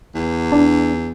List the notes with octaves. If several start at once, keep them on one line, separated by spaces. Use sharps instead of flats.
E2
D4